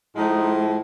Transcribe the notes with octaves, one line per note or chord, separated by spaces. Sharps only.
A2 F3 G#3 D#4